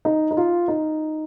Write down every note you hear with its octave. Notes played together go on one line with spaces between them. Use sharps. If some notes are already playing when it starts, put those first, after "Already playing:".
D#4
D#4
F4
D#4